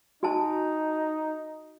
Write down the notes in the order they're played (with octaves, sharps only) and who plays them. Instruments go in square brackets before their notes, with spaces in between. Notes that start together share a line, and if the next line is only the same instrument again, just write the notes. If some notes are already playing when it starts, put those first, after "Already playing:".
[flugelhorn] D#4 [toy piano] F#4 G#5 A5